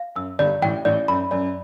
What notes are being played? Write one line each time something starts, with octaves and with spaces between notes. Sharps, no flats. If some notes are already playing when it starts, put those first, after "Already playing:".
Already playing: F5
F#2 E6
G1 G2 D5
A1 A2 G5
A1 A2 D5
F#2 B5
F#2 D5